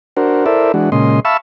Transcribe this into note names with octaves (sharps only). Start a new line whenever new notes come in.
D4 F#4 A#4 C5
E4 A4 A#4 C5 D5 E5
E3 G#3 D4 F#4
A#2 C#3 G#3 D#5 C6
E5 F5 A5 B5 C#6 E6